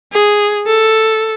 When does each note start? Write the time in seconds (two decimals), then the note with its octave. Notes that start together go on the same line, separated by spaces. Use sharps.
0.12 G#4
0.66 A4